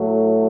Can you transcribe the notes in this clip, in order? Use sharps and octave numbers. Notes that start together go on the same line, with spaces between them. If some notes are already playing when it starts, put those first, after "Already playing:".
Already playing: A2 F#3 A3